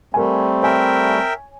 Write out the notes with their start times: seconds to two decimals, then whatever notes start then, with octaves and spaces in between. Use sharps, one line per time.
0.14 G3 A3 C4 A#4 G#5
0.63 A#4 C#5 E5 G5 G#5